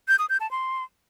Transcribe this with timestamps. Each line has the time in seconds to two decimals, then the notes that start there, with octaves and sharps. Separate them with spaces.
0.08 G6
0.19 D#6
0.30 G6
0.40 A5
0.51 C6